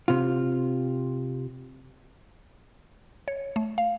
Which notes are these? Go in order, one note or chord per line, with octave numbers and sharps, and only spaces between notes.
C3 F4
C#5
A3
F5